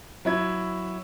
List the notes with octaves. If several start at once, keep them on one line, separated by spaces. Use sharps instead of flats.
F#3 E4 G#6